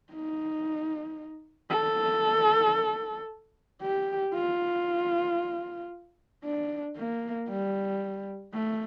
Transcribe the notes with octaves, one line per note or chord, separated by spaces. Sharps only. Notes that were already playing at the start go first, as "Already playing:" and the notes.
D#4
A4
G4
F4
D4
A#3
G3
A3